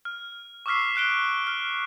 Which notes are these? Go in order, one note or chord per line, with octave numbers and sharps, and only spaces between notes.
F6
C#6 D6 E6 F6 B6 C7
F6 F#6 D7 G7
F6